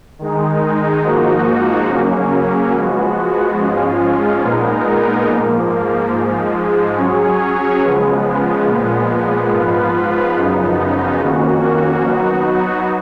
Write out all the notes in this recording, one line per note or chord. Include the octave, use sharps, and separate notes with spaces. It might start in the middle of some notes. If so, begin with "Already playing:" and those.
D#3 G#3 D#4
G#2 F3 A#3 D#4 F#4
C#3 F#3 A#3 C#4
F3 G#3 B3 F#4
G#2 F3 G#3 C#4 F4
A#2 G#3 B3 D#4 A#4
G#2 F3 A#3
G#2 F3 G#3
F#3 C#4 G#4 C#5
C#3 F3 G#3 B3
A#2 F3 G#3 B3
G#2 F3 B3 F4 B4
F#2 C#3 F3 B3 D#4
F2 D#3 A#3 C#4 F#4
F#3 B3 D#4 F#4